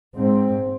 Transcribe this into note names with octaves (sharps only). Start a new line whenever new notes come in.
G#2 C4